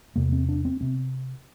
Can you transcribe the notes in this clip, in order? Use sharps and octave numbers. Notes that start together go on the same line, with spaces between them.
E2 C3 A#3
C4
D4
C4
C3 C4